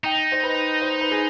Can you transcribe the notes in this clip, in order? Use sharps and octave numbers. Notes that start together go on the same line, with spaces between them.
D#4 G5
C5
B4
C5
B4
G#4